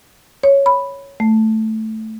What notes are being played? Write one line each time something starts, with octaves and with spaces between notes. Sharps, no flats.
C#5
B5
A3